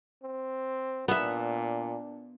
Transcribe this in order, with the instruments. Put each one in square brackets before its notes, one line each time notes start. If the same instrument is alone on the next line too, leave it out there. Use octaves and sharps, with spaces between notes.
[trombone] C4
[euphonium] A#2 [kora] B3 E5 [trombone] D4